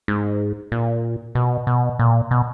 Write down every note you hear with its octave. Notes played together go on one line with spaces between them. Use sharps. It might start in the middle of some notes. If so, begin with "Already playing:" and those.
G#2
A#2
B2
B2
A#2
B2